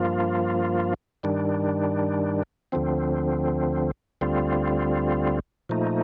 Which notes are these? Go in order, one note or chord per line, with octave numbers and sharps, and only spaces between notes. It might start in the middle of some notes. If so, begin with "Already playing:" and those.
Already playing: G2 F3 A#3 F4
G2 D#3 G3 D4
D2 D3 F3 C4
D2 D3 G3 C4 F4
A#2 F3 A3 D#4